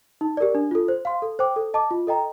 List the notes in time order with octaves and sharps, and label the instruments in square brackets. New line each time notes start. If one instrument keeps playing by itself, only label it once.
[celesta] D#4
G4 A#4 D5
D4
F4 A4
C5
F5 C6
A4
C5 G5 D6
A4
D#5 A5 D6
F4
A4 D#5 G5 A#5